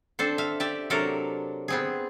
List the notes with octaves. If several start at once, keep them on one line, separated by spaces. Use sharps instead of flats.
C4 D4 A4 C5
E5 F5
G4 D5 E5
C3 F#3 D4 A4 A#4
B3 C4 G#4